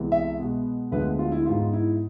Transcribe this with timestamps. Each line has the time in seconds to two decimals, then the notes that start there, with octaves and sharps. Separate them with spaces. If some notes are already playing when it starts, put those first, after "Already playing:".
Already playing: C2 C3 E3 G#3 B3
0.12 E5
0.39 B2 G#3 B3
0.92 D2 D3 F3 G#3 B3 B4
1.19 F4
1.32 E4
1.46 G#2 G#3 B3 F4
1.73 E4